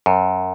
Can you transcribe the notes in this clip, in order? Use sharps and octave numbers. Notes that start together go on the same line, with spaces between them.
F#2